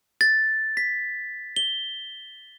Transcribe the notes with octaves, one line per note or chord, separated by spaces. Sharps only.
A6
B6
G7